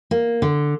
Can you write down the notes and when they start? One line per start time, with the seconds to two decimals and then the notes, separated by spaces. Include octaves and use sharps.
0.11 A#3
0.42 D3